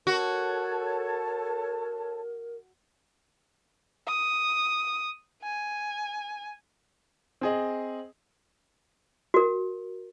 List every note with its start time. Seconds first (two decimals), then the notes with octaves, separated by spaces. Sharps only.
0.07 F#4 A4 A#4 C#5 A5
4.07 D#6
5.42 G#5
7.41 C4 G#4 D#5
9.34 F#4 A#4